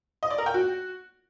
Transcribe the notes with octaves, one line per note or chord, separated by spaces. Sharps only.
D#5
D5
A#4
G5
F#4